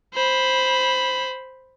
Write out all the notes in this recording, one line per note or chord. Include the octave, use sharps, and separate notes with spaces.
C5 B5